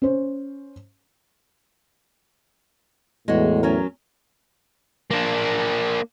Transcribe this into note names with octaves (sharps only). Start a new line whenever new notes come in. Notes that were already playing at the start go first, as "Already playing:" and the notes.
C#4 C5
E2 A2 G#3 F#4
F#3 C#4 A#4
A#3 D4